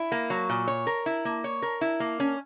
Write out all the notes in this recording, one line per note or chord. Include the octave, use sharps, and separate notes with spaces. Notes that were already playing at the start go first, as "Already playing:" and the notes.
Already playing: E4
A#3
F#3
A#2
C#5
A#4
E4
A#3
C#5
A#4
E4
A#3
C#4